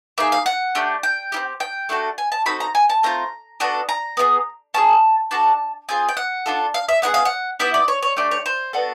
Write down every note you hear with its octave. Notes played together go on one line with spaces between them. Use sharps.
A#3 D#4 G#4 E5
F5
F#5
A3 D4 G4
G5
C4 E4 G4
G5
A3 D4 F#4 A4
G#5
A5
C4 D#4 F#4 A4 B5
A#5
G#5
A5
A3 C4 F4 A#5
B3 D4 F#4 A4
A#5
B3 E4 G#4
C#4 F4 G#4 A5
D4 F#4 A4 A5
C4 F4 G#4 G#5
G5
F#5
D4 F4 A4
F5
E5
B3 E4 G#4 F#5
F5
F#5
B3 E4 G4 E5
D5
C#5
C#5
A3 D4 G4 D5
C#5
C5
B3 D4 F#4 A4